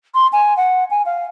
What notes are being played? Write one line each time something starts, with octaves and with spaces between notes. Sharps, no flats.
C6
G#5
F#5
G#5
F5